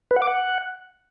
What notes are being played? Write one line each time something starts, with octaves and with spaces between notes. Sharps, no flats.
B4
F#5
D6
F#5